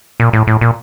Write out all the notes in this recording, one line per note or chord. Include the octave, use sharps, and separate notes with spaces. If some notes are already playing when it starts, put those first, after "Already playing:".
A#2
A2
A2
A#2